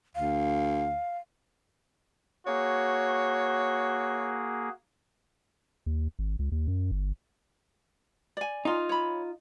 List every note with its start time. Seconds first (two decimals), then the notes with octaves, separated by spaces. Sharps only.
0.15 D2 F5
2.47 A#3 F#4 G#4 C#5
5.86 D#2
6.19 G#1
6.39 C#2
6.52 D#2
6.68 F#2
6.92 G1
8.37 D5 G#5
8.65 D#4 F4
8.89 C#5 B5